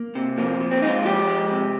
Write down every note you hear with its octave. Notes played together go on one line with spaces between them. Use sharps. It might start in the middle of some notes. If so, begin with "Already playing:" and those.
Already playing: A#3
C3
F3 A#3
A#2
C4
G#3 D#4
F4
F3 G4
G#3
C3